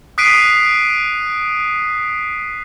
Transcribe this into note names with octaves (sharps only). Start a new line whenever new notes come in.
D#6 F#6 B6 C7 D7 D#7